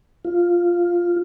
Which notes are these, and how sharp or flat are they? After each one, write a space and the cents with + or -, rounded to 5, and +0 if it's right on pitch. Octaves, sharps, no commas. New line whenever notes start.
F4 +0